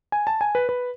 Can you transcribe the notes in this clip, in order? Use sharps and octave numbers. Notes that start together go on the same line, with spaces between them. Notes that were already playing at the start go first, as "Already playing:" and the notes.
G#5
A5
G#5
B4
B4